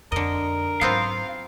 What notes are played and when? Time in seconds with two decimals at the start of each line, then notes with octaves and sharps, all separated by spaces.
0.12 F2 D3 A#4 D#5
0.81 G#2 F#3 B3 C4 F4 F5